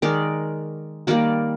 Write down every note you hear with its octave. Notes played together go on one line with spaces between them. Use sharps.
D#3 G#3 A#4 D5
D#3 G3 A#3 A#4 D5